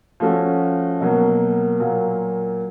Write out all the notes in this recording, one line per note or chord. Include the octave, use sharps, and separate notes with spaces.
F3 A3 C#4 F#4
B2 F#3 A#3
A#2 F#3 A#3